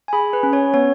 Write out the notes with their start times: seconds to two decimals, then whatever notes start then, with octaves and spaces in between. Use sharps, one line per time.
0.08 G#5
0.13 G#4 B5
0.33 B4
0.43 C#4
0.53 C#5
0.74 B3 C#5